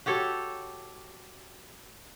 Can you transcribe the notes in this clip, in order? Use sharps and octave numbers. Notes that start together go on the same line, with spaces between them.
F#4 G4 A4 C#5